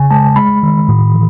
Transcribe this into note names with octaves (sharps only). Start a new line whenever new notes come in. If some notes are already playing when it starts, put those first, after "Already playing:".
Already playing: C#3 G#5
G#3 A5
G#3 B5
D#3
A2
E3